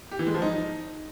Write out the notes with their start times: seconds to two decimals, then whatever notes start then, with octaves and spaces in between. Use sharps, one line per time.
0.11 G4
0.19 E3
0.27 G#3
0.34 F3
0.42 D#4